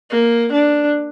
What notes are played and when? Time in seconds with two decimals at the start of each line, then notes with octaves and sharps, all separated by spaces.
0.11 A#3
0.52 D4